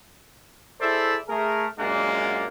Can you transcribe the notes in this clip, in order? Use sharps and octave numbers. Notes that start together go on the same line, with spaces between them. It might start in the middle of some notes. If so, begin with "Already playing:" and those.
E4 G#4 A4 C5 D5 E5
A3 G#4 A#4
F#2 A#2 G#3 A#3 D4 F#5